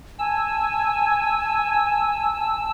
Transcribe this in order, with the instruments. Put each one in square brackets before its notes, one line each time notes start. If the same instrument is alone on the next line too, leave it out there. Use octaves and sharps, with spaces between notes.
[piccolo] G#5 [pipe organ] A5 E6